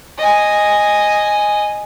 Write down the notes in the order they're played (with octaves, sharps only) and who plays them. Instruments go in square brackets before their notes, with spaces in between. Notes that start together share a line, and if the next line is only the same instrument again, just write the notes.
[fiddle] D#5 G#5